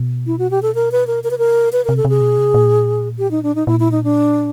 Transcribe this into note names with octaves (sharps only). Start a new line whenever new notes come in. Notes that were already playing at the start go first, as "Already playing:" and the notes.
Already playing: B2
E4
F#4
G4
A4
A#4
B4
A#4
C3 A#4
B4
A#4
B2
C3 B4
C3 A#4
A4
C3 G#4
B2
C3
A#2
G4
D#4
D4
D#4
A#2 E4
E4
D#4
D4